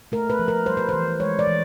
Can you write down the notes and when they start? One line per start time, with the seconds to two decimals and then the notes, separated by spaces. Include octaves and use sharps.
0.12 A3 A#4
0.30 B4
0.39 F3
0.48 A#4
0.66 G3 C5
0.77 B4
0.89 E3 C5
1.20 G#3 C#5
1.39 D5
1.47 E3